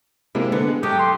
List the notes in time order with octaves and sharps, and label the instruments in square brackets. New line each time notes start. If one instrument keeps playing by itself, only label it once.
[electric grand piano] C3 G#3 A#3 [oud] E4
[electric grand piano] D3 [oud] B3
[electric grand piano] G#3
[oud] G2 F#3 A3 [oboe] G4 [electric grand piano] D#6
[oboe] C6